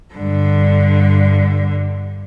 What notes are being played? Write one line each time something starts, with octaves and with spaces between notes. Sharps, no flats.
G2 D3